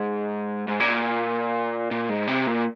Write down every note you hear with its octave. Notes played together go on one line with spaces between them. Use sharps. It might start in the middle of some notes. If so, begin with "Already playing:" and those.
Already playing: G#2
G#2
A#2
A#2
G#2
C3
A#2